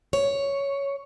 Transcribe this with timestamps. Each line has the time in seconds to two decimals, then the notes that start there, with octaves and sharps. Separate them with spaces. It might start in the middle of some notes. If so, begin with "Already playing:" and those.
0.13 C#5